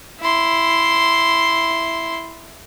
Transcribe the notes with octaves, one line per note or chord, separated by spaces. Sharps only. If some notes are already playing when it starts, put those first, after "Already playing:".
E4 C6